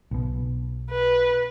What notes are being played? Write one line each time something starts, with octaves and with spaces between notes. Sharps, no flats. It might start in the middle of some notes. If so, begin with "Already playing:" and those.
B1 B2
B4